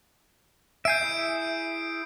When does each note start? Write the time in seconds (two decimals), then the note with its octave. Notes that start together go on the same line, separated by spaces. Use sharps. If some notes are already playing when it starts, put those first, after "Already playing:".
0.85 E5 G#5 G6 C7 D7
1.02 E4 G#4 E5